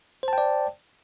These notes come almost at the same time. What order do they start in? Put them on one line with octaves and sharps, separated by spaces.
C5 A5 G5 D5